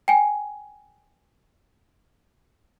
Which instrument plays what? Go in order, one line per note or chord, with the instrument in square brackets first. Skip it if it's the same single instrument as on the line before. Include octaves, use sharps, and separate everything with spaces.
[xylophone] G5 G#5